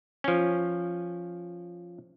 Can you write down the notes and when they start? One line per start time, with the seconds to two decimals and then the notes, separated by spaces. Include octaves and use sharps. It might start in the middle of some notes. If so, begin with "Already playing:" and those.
0.24 F3 C#4